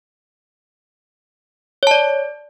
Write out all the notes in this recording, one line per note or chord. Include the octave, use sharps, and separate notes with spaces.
C#5 D5 A5